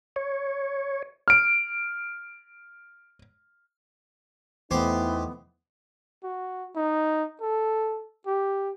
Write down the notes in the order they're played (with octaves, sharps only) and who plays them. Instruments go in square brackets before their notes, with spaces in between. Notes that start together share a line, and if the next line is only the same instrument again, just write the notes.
[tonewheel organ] C#5
[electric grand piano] F6 D7
[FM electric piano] E2 A3 [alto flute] B3 [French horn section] D#4 E4 [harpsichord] G4 C5 G#5
[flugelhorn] F#4
D#4
A4
G4